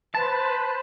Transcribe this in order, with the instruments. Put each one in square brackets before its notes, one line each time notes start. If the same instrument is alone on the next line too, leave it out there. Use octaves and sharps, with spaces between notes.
[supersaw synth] B4 C5 B5 [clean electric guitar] A5